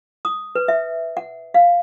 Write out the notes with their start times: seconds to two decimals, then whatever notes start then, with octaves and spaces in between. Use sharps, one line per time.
0.25 D#6
0.55 B4
0.68 E5
1.17 F#5
1.54 F5